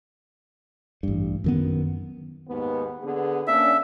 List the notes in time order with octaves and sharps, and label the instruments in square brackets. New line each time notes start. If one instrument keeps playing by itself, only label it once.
[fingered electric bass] A1 G2
F#2 D#3 B3
[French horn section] D#2 G#2 B3
D3 B3 G#4
[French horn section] A#3 C#4 D4 [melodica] E5